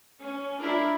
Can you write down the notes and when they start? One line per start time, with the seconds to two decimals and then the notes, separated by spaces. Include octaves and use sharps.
0.21 C#4
0.61 D4 E4 A#4